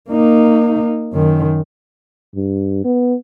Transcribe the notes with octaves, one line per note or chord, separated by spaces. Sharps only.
A#3 D#4
F#2 D#3
G2
B3